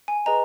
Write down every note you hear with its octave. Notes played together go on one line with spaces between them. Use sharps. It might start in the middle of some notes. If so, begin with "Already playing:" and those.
G#5
G#4 B4 D#5 A#5